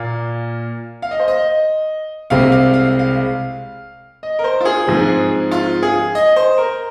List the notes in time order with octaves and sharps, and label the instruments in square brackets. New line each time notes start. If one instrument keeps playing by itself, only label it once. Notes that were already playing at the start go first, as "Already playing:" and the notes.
Already playing: [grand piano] A#2 A#3 F5
F5
D#5
C5
D#5
C2 C3 G#3 C4 F5
F5
F5
F5
D#5
A#4
C5
F4
G#4
G#2 F3 G#3 C4
F4
G#4
D#5
C5
A#4